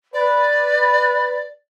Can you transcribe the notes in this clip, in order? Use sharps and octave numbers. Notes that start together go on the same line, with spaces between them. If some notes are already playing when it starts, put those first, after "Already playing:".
B4 D5